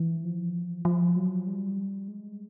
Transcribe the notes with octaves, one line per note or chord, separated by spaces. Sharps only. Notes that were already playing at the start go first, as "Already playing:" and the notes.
Already playing: E3
F3
F3
F#3
G3
G#3